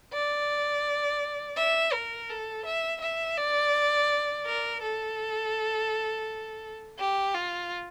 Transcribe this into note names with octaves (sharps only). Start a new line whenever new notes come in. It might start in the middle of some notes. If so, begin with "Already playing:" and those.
D5
E5
A#4
A4
E5
E5
D5
A#4
A4
G4
F4